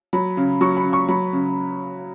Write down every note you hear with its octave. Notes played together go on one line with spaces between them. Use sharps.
F#3 B5
C#3
F#3 C#6
B5
C#3
C#6
F#3 B5
C#3